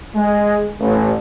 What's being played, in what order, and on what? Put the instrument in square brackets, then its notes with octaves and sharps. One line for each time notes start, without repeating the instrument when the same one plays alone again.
[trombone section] G#3
A1